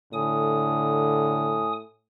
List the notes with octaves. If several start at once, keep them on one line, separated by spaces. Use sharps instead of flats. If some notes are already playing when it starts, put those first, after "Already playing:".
A2 D3 G#5 D#6